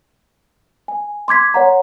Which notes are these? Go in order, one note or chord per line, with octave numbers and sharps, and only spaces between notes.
G#5
C6 D6 G#6 B6
C#5 F#5 A#5